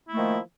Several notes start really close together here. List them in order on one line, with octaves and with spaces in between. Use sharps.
E4 A#3 A3 D#3 F3